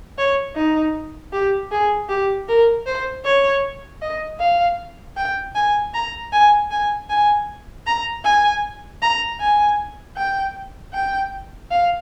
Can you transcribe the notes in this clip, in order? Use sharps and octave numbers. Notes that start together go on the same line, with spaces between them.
C#5
D#4
G4
G#4
G4
A#4
C5
C#5
D#5
F5
G5
G#5
A#5
G#5
G#5
G#5
A#5
G#5
A#5
G#5
G5
G5
F5